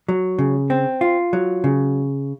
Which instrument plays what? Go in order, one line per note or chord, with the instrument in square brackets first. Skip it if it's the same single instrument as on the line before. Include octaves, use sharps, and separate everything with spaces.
[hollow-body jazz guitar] F#3
C#3
C4
F4
F#3
C#3